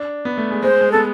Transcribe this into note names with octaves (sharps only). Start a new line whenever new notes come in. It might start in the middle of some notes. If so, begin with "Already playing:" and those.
Already playing: D4
B3
A3
G#3
G#3 C5
G#3
B3 A4